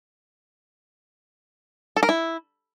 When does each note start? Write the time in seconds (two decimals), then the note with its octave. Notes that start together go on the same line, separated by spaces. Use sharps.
1.96 A4
2.03 A#4
2.09 E4